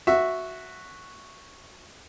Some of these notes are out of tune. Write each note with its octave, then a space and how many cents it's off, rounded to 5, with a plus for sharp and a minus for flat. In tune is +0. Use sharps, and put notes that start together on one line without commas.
F#4 -5 E5 +0